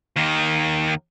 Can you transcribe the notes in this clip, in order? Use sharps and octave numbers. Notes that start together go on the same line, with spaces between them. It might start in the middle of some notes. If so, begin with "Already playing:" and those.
D#2 D#3